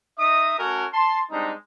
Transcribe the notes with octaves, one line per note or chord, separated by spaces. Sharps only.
D#4 D#5 E5 D#6
A3 C#4 F#4 A4 A#4 G#5
A5 C6
G3 G#3 C4 D4 D#4